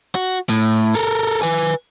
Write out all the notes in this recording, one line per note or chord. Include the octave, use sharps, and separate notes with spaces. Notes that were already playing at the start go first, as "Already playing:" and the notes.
F#4
A2
A4 A#4
B4 G#5